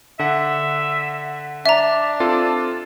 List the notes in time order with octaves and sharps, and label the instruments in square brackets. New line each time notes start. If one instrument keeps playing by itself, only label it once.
[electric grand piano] D3 F#5 [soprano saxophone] E5
[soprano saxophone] D4 [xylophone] E5 A#5
[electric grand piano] C4 F4 A4